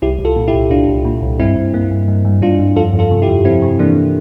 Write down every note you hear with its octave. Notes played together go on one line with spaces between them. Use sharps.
C2 E4 G4
C2
F4 A4
A#2
E4 G4
C2
C2 D4 F4
C2
A#2
C2
G2 C4 E4
G2
G2 A#3
G2
G2
G2
G2 D4 F4
G2
F2 F4 A4
F2
F4 A4
C3
E4 G4
F2
F2 C4 E4
C3
E3 A#3 D4